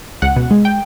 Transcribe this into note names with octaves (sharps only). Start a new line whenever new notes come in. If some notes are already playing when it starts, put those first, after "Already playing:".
C#2 F#5
B2
G#3
G5